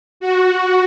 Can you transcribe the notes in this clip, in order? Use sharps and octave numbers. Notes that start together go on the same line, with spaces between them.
F#4